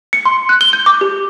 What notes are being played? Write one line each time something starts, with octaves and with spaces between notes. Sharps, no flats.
C#7
C6
F#6
G7
G6
D6
G4